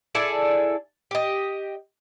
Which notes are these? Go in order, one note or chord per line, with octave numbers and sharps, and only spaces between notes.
E4 G#4 A4 D5
G4 D#5